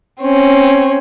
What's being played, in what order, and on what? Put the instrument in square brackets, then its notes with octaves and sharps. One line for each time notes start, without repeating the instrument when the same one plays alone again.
[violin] C4 C#4